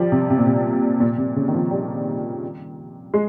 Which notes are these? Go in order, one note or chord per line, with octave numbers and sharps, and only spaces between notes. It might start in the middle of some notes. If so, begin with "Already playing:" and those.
Already playing: F3 G3
C3
C3
A#2
C3
A#2
C3
C#3
D#3
F3
G3
G#3